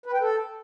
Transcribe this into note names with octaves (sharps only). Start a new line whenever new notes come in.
B4
G5
A4